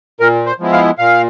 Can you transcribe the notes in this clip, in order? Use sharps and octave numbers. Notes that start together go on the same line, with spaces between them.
A#2 A#4
C5
F3 G#3 B3 E4
F5
A#2 F5